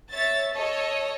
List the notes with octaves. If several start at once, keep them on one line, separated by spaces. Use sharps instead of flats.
C#5 E5 A6
A4 C#5 D#5